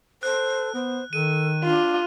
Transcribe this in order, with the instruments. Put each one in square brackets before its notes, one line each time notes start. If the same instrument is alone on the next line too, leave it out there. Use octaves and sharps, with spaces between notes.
[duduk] A4 [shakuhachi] C5 [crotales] F#6
[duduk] B3 [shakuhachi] C5
[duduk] D#3 [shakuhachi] A4 [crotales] D#7
[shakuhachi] D4 [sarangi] F4